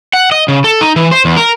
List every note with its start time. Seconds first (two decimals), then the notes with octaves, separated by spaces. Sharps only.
0.13 F#5
0.32 D#5
0.48 C#3
0.64 A4
0.81 D#4
0.96 E3
1.11 C5
1.25 E2
1.37 A#4